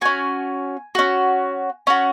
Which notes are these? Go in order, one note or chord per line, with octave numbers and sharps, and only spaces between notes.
C#4 F#4 G#5
C#4 F#4
C#4 F#4